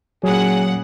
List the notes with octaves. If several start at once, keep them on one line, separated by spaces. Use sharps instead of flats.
A#2 C#3 F#3 G#4 F#5